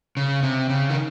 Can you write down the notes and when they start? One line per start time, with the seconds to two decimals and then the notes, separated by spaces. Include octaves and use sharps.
0.17 C#3
0.43 C3
0.69 C#3
0.90 D#3